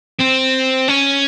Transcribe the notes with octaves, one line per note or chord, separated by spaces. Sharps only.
C4
C#4